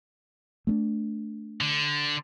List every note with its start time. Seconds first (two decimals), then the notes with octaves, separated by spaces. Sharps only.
0.67 A3 A#3 D4
1.61 D3